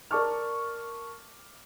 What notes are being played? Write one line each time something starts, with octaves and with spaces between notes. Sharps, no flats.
A#4 D5 A5 C#6 D6 F6